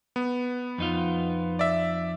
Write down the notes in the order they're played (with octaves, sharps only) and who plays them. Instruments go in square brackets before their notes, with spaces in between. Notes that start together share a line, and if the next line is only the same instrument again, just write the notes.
[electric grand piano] B3
[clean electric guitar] F2 D#4 F4
[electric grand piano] D5 E5